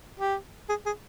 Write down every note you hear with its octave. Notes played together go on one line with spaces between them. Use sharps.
G4
G#4
G#4